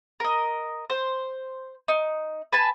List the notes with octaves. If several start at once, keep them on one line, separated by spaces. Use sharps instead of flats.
A#4 D#5
C5
D#4
B4 G#5 A5